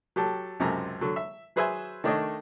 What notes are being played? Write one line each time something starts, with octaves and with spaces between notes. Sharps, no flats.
F#3 G4 A4
C#2 F#2 C3 A4 A#5
D3 F#3
E5
F#3 G#4 B4 C5 E5 G#5
D#3 A3 D4 C#5 D#5